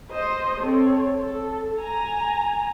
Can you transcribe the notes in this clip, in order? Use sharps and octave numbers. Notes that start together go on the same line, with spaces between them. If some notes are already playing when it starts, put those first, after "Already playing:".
C5 D#5
C4 A4 C#5
A4
G#5 A#5